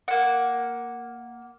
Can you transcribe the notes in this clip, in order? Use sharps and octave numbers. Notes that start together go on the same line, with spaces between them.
A#3 F#5